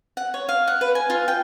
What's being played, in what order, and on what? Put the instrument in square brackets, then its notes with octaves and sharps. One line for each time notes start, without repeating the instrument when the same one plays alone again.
[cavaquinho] F#5
C#5
F5
F#5
B4
G#5
F4
G5